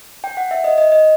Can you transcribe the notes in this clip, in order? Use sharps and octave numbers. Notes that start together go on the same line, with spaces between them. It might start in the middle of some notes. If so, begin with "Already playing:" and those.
G5
F#5
E5
D#5
D#5
D#5